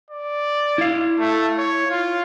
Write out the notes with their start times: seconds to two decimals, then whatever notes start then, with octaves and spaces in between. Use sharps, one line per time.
0.11 D5
0.78 E4 F5
1.19 A3
1.58 C#5
1.90 F4